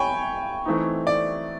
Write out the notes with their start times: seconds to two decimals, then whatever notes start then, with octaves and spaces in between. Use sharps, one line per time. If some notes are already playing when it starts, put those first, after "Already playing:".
Already playing: C#5 G5 G#5 B5
0.65 E3 A3 C4 D#4
1.07 D5